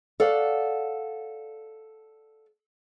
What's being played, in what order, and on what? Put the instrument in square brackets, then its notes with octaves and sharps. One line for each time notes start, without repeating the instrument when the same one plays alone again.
[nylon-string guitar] A4 C#5 D5 F5 F#5